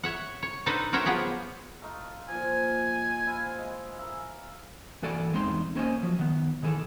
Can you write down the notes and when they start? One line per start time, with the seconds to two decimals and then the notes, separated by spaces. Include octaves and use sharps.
0.03 C#5 E5 F#5
0.43 C#5
0.66 D4 D#4 A4 B4 C5 D#5
0.93 F#4 A#4 C5 C#5 E5 G5
1.06 F3 B3 G4 G#4
1.82 A3 D#4 F4
2.29 A#2 F3 G#5
3.27 E4 F4 C5
3.58 G#3
3.98 A#4 E5 F5
5.03 E3 F#4 A4 D5 G#5
5.33 E2 G#3 C4 D#4 C6
5.75 A#3 B3 C#4 C5 D#5 G#5
6.03 F3 F#3
6.19 D#3 B3
6.63 D#3 E3 G#4 A4